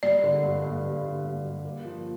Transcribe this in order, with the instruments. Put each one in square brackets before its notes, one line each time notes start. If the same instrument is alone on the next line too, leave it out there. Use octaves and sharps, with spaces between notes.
[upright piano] G3 [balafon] D5
[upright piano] D3
G2
G2
G3
D3
G2
G2
A#3
F3